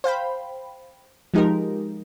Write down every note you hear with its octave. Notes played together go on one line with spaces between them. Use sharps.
C5 F5 G5 B5
F3 G#3 D#4 G4 A#4